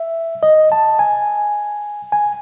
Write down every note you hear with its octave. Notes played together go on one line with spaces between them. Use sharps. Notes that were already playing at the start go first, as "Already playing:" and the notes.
Already playing: E5
D#5
A5
G#5
G#5